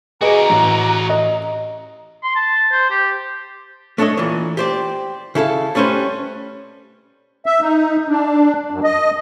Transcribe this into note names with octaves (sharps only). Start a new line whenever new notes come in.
F#4 G#4 B4 D5 D#5 A#5
A1
D#5
C6
A5
C5
G4
A3 D4 A4 C#5 D#5
A#2 E3
G4 C5 D5
C#3 E4 A4 F5
G3 A3 C#4 B4 C5
E5
D#4
D4
F#2
D#5